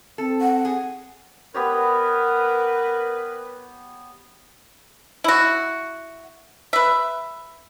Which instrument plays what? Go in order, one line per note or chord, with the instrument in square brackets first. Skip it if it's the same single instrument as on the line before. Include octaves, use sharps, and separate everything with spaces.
[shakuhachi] C4 [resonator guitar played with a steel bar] A4
[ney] F#5
[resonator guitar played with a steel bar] G#4
[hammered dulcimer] B3 G4 C#5 [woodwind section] A#4 B4
[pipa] E4 F#4
B4 E5